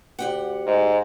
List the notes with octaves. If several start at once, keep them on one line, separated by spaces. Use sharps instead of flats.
D2 G4 F#5
G#2